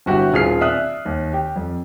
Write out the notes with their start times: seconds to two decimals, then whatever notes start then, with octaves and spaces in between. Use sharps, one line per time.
0.06 G1 E4 F#4 G4 F#5 G5
0.32 D#1 F4 G#4 F6 C7
0.61 D5 E5 D#6 F#6
1.05 D#2
1.33 G4
1.56 F2